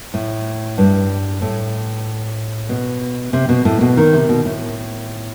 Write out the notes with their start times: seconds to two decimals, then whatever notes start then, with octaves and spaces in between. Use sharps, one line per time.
0.14 A2
0.78 G2
1.42 A2
2.69 B2
3.33 C3
3.49 B2
3.65 A2
3.81 B2
3.97 D#3
4.13 C3
4.29 B2
4.45 A2